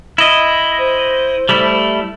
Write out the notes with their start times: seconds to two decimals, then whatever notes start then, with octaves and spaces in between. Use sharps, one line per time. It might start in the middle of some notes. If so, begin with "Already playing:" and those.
0.18 E4 D#5
0.79 C5
1.49 G3 A3 E4